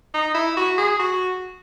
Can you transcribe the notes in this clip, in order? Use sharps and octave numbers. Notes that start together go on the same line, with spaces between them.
D#4
E4
F#4
G#4
F#4